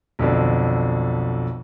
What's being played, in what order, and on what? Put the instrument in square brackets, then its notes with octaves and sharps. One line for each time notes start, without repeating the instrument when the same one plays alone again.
[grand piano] B1 F2 D3